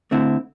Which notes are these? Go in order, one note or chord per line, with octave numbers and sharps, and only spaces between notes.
D3 A3 C4 E4